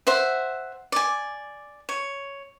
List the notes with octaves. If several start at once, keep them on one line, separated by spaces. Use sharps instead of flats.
C5 E5 F#5
D5 G#5
C#5